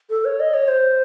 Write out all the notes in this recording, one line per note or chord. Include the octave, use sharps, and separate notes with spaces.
A4
C#5
D#5
C#5
C5